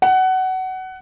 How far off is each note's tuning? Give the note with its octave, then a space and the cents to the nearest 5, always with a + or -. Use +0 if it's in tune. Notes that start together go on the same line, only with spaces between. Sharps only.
F#5 +20